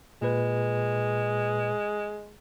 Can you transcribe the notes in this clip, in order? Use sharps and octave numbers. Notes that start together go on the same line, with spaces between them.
A#2 G#3 B4